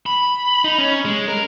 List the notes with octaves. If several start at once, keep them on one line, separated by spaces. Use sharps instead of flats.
B5
D#4
C#4
G#3
A#4